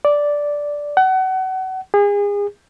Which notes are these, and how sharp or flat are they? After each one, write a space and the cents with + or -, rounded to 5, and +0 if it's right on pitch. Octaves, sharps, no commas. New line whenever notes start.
D5 -5
F#5 +30
G#4 -35